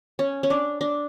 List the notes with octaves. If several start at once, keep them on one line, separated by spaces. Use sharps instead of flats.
C#4
C#4
D4
D4